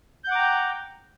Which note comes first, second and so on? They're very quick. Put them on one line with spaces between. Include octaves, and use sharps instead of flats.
G6 F#5 D6 A#5 G5